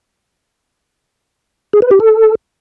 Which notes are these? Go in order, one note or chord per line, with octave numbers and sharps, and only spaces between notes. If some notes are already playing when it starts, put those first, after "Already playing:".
G#4
B4
G4
A4